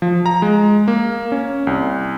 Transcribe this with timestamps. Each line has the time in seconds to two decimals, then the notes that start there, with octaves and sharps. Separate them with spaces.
0.02 F3
0.26 A#5
0.42 G#3
0.88 A#3
1.32 C#4
1.67 C2